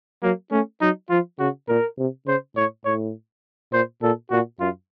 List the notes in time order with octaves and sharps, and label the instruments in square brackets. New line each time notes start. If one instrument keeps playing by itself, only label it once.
[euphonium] F#3 [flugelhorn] A#3
[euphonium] A3 [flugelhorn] C#4
[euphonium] F#3 [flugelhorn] D#4
[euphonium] F3 [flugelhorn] F4
[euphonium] C#3 [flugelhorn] F#4
[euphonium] A#2 [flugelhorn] A#4
[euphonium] C3
[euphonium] C#3 [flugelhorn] C5
[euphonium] A2 [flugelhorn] C#5
[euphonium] A2 [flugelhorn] C#5
[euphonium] A#2 [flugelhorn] C5
[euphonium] A#2 [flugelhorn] A4
[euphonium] A#2 [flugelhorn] F#4
[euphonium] F#2 [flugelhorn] F4